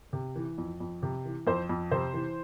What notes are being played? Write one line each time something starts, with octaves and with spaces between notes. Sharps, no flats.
C3
E3
F2
F2
C3
E3
F2 C5
F2
C3 C5
E3